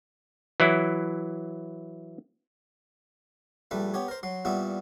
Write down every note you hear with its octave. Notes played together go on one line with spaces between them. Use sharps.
E3 F#3 E4
A#1 G3 A3 B4
B3 G4 C#5
A#4 C5
F#3 C6
A#2 G3 B3 E4 F#4